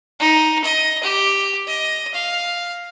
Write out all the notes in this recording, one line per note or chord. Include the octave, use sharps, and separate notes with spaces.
D#4
D#5
G4
D#5
F5